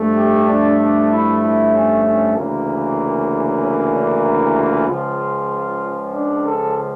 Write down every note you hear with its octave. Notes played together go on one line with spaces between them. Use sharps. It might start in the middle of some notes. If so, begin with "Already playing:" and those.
Already playing: G2 F3 A3
G4
D4
D4
E4
E4
C#4
C#4
D2 C#3 E3 A#3
C#4
D4
E4
F4
C#2 C#3 F3 F4
D4
A4